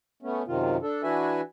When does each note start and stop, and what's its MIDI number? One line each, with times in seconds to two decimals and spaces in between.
0.23 0.43 57
0.23 0.43 59
0.23 0.43 61
0.47 0.77 42
0.47 0.77 48
0.47 0.77 51
0.47 0.77 65
0.82 1.03 62
0.82 1.03 69
1.03 1.41 52
1.03 1.41 62
1.03 1.41 66
1.03 1.41 71
1.03 1.41 76
1.03 1.41 80